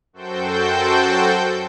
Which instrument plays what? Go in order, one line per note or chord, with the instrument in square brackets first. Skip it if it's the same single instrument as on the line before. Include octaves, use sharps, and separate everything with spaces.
[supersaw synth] F#2 F#4 A4 C5 G5 G6